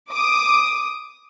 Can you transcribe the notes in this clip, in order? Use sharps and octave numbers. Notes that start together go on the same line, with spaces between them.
D6 D#6